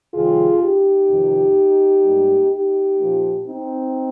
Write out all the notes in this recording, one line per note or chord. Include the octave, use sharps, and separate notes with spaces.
F2 C3 D#3 G3 F4 G#4
D#4 G4
F2 C3 D#3
G#2 G3 A#3
D#4 G4
A#2 F3 A#3
C4 D#4